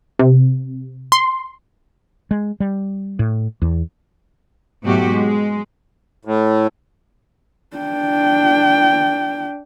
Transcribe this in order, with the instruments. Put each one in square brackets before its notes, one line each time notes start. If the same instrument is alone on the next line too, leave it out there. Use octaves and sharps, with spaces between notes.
[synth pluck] C3
C6
[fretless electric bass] G#3
G3
A2
E2
[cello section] G#2 B2 F#3 A3 F#4 G4
G#3
[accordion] A2
[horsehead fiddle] D4 G5